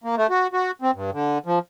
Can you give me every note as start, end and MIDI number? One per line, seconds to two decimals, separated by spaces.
0.04 0.15 58
0.17 0.27 57
0.30 0.47 66
0.53 0.71 66
0.82 0.91 60
0.95 1.10 43
1.13 1.38 50
1.46 1.59 53